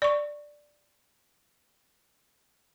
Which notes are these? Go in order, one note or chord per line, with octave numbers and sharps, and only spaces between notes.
D5 C#6